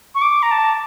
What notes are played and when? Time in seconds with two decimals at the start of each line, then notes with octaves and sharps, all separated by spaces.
0.15 C#6
0.22 D6
0.42 A#5
0.51 A5